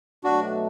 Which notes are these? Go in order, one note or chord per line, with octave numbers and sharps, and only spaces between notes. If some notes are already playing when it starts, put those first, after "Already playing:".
B2 F#3 A3 D4 F#4